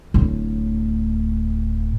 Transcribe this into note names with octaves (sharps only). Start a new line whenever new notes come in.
D1 A2